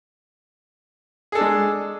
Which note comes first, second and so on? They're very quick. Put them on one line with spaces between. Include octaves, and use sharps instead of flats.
G#4 A4 D4 G#3